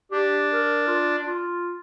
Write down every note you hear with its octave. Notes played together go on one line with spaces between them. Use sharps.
D4 G4
A#4
F4
F4